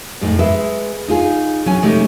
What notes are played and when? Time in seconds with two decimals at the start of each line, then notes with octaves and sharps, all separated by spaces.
0.21 F2 A2 G#3 D#4
0.39 G#3 G#4 B4 E5
1.08 D#4 F4 G#4
1.66 F#3 C#4 G#5
1.82 C3 G#3 A3 C#4 D#4 G4